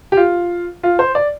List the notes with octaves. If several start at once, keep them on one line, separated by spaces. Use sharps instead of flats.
G4
F4
F4
C5
D5